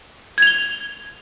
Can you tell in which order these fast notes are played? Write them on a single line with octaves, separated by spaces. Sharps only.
G#6 F7 G7